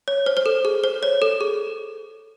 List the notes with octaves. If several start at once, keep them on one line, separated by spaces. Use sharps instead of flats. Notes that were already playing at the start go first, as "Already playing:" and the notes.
C#5
C5
C5
A4
G#4
C5
C#5
A4
G#4